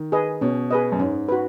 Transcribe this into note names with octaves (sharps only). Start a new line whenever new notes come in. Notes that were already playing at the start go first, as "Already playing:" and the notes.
Already playing: D#3
G#4 B4 D#5
B2 C#4
G#4 B4 D#5
F#2
G#2 C#4
F#4 B4